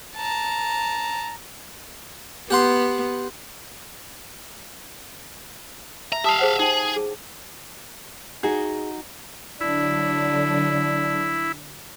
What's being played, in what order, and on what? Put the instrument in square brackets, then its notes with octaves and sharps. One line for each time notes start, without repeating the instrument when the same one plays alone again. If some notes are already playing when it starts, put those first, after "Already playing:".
[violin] A5 A#5
[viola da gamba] B3 [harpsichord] G4 F#5 C6
[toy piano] E5 [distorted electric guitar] A#5
[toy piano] G4 A5 D#6 [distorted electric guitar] E5 F5
[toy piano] G#4 C5 F#5
[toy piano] D#4 G5 [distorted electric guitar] G#4
[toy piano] G#4
[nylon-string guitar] D#4 F#4 F#5 [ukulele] G#4
[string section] D3 F#3 D4 [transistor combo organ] E4